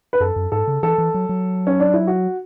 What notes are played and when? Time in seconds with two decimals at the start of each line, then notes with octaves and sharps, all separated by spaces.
0.13 B4
0.20 F#2 A4
0.36 F#2
0.52 G#2 A4
0.67 C#3
0.83 E3 A4
0.98 E3
1.14 F#3
1.29 F#3
1.67 C#4
1.80 D4
1.94 E4
2.07 F#4